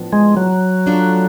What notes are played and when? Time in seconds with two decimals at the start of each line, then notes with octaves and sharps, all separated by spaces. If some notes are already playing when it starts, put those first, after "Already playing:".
Already playing: A2 F3 B3 D4
0.13 G#3
0.37 F#3
0.86 F3 A3 D4 F4 A4